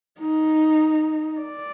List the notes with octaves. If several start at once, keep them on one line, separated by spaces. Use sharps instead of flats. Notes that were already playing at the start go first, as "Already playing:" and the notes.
D#4
D5